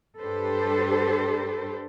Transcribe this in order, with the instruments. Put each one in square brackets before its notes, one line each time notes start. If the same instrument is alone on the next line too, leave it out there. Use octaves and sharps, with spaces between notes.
[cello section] G2 D4 G4 A4 B4 C5